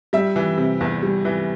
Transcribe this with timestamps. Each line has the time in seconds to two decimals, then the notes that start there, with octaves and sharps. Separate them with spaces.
0.13 G3 E5
0.36 E3
0.58 C3
0.81 E2
1.03 G3
1.25 E3